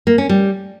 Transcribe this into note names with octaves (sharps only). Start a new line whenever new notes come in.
A#3
C#4
G3